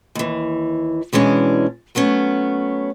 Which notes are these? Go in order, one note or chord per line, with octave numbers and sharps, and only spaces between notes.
D#2 E3
B2 E3 G#3 C#4 D4
F#3 A3 B3 C#4